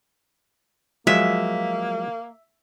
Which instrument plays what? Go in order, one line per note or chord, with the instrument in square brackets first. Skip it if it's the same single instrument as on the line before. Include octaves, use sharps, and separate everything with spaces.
[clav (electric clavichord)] F3 F#3 G#3 [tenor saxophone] A#3 [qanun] E5